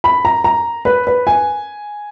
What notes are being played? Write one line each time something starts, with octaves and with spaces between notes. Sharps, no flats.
B5
A#5
A#5
B4
B4
G#5